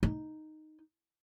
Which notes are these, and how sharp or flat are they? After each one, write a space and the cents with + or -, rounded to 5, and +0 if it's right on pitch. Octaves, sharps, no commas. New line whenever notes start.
D#4 -5